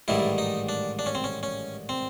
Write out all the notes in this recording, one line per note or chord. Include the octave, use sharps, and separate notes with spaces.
A1 G#2 D#3 G3 E4
D#4
D4
D4
C#4
C4
C#4
C#4
C4